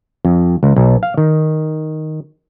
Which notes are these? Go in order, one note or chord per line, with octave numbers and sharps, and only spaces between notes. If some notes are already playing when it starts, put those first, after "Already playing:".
F2
C#2
B1
F5
D#3